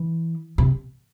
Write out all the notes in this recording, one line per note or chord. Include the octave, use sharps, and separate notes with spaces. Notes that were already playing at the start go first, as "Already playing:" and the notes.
Already playing: E3
C3